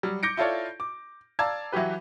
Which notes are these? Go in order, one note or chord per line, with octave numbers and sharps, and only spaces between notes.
F#3 G3
D6 G6 A#6 C#7 D7
E4 F4 A4 C#5 D5
D6
D5 F5 A5 A#5 E6 G#6
E3 F#3 F#4 G4 B4